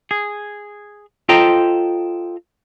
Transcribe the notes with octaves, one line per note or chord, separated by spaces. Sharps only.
G#4
F4 A4 C5 D#5 G5 A#5